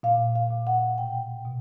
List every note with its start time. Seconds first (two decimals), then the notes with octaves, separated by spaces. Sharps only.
0.03 A#2 F5
0.35 F5
0.51 A#2
0.67 F#5
0.98 B2 G5
1.45 B2